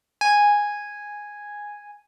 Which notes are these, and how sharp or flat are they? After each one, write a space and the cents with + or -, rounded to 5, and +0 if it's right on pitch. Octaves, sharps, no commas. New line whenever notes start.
G#5 -5